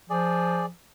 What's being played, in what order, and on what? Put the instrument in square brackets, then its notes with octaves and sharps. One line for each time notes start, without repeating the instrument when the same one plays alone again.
[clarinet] F3 [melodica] G#4 D5